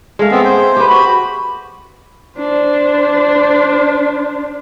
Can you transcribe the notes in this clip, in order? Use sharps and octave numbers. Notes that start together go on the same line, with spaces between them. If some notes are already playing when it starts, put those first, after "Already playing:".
G#3 A3 F5
B3 C4
C5
G4 B4
F#4 B5
D4 C5